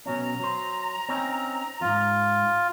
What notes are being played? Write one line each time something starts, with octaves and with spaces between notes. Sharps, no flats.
B2 F#3 C#4 A#5
F#3 C5
C4 C#4 D#4
F2 G#2 F4